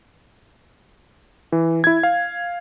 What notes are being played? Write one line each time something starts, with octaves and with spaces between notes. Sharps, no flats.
E3
E4 G#6
F5